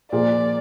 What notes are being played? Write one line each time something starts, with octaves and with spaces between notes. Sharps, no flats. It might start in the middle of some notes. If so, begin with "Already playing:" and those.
A#2 F3 A#3 F4 G#4 D5